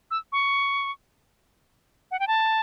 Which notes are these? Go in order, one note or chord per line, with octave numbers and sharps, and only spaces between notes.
E6
C#6
F#5
G5
A5